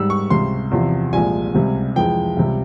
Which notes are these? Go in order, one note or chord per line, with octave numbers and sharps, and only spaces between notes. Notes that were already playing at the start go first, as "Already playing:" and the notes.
Already playing: G#2 G3 E6
C#6
C#2 C3 G3 C6
E2 C3 F3
C2 A#2 F3 G#3 G#5
C#2 C3 G3
F2 E3 G#3 G5
C#2 C3 G3